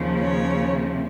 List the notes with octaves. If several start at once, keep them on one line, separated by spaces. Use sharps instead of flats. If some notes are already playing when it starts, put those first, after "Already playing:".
Already playing: D#2 C#3 F3
C#5